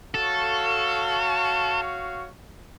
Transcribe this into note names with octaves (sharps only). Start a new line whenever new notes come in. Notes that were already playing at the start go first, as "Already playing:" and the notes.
F#4 A4 C#5 F5